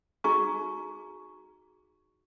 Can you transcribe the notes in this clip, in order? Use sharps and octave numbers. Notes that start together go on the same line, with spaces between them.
D#4 F#4 G#4 A#5 C#6